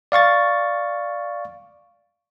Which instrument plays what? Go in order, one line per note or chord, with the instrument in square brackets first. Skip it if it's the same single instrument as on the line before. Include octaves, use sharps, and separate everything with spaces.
[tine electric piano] D5 F5 C#6 A6